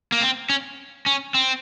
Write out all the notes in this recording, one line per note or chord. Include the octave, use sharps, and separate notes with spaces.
A#3
C4
C#4
C#4
C4